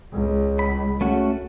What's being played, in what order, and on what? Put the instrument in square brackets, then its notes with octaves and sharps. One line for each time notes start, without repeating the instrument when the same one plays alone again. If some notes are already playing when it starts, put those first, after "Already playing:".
[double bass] C#2
[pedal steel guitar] B5
A3 C#4 F#4